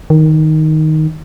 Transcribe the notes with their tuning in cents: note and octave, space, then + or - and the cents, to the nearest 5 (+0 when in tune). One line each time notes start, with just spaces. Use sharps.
D#3 +5